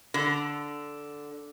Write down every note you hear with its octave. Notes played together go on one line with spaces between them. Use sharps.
D3